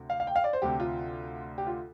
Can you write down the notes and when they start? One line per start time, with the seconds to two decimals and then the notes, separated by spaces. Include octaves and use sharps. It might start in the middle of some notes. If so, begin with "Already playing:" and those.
Already playing: D2 C3
0.10 F5
0.20 F5
0.27 G5
0.36 F5
0.44 D5
0.53 C5
0.62 D2 C3 G4
0.80 F4
1.58 G4
1.67 F4